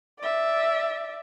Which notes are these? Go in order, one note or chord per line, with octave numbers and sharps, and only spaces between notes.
D5 E5